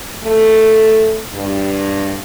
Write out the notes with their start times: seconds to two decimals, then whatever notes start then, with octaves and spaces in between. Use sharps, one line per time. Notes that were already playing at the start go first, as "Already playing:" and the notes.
0.24 A3
1.33 G2